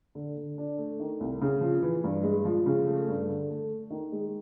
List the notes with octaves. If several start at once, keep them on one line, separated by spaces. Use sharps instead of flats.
D3
D3
D4
A3
D#3
C2
C#3
F3
E3
G2
G#3
F3
C#3
A3
G2
D3
A3
A3
D#3
G#3